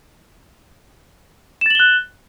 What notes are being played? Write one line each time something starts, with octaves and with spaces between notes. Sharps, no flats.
F#6 A6 E7 F#7 G7